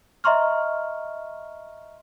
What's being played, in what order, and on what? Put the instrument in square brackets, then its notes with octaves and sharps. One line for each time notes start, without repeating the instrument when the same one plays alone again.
[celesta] D#5 E5 A#5 C6 C#6 F6